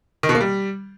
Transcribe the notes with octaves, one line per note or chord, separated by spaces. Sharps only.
D#3
B2
A#3
G3